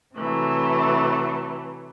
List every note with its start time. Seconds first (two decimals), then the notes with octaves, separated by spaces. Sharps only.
0.16 C3 E3 F#3 A3